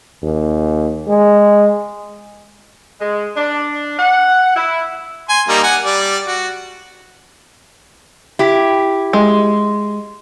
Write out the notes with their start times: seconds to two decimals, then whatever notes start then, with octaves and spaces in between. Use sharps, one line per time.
0.23 D#2
1.08 G#3
3.00 G#3
3.36 D4
3.99 F#5
4.56 E4
5.29 G#5 C6
5.48 G3 A#3 D#4
5.63 F#5 G#5
5.85 G3 D5
6.27 F#4
8.39 E4 G4
9.13 G#3